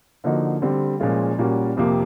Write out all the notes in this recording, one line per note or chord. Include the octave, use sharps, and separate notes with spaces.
D3 F3 A#3 D#4 F#4
D3 G3 C4
A#2 F3 G#3 C#4 F4
A#2 G3 A#3 C#4 F#4
F2 C3 F3 A#3